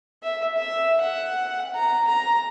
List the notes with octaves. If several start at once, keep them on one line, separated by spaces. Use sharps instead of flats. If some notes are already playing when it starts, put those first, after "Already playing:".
E5
E5
F#5
A#5
A#5